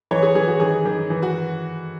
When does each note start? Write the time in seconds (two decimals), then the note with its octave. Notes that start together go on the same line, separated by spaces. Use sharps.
0.11 E3 C#5
0.23 G#4
0.35 E3 G#4
0.47 F#4
0.60 D#3 G#4
0.85 D#3
1.10 E3
1.23 F#4